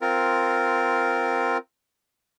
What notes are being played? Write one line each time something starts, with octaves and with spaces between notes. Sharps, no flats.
C4 F4 A#4